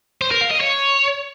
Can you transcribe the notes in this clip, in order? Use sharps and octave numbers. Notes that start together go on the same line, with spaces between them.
C5
A#4
F5
D#5
C#5